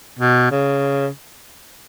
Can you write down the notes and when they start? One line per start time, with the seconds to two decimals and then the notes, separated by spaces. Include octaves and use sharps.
0.20 B2
0.51 C#3